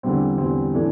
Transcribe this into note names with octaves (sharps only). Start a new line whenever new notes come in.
E2 D3 G3 C4
E2 D3 G3 C4
A2 E3 A3 D4